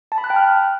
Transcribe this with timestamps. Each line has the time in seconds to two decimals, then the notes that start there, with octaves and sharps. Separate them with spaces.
0.12 A5
0.18 B5
0.24 F#6
0.30 G5
0.36 F6